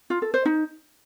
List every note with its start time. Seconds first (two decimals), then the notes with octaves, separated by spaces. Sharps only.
0.10 F4
0.22 A4
0.34 C5
0.45 D#4